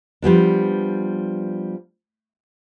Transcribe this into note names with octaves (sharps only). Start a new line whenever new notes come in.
F3 G3 B3 D4